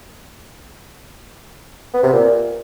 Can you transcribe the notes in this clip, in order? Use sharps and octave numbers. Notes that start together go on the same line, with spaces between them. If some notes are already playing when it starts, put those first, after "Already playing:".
B3
C3
A#2